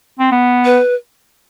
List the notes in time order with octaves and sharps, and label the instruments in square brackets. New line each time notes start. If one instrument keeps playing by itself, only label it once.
[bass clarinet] C4
B3
[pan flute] B4